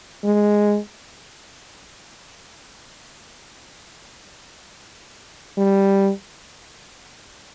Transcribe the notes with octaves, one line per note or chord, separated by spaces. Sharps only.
G#3
G3